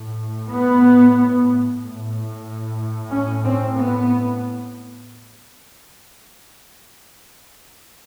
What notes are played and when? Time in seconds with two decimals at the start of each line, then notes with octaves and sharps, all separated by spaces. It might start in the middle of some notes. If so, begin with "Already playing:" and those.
Already playing: A2
0.51 B3
1.81 A2
3.11 C#4
3.44 C4
3.76 B3